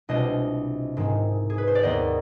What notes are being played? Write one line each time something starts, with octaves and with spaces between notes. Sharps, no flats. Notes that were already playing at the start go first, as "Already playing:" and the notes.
C2 B2 G#3 D4 F4 C5 D#5
G#2 D#3 G#3 C4
G#4
B4
C5
D5
D#2 D#3 B3 C5 D#5